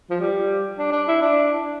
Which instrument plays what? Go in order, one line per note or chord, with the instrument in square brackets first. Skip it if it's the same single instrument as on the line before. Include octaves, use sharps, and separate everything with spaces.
[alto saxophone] F3
G3
D4
D4
E4
D4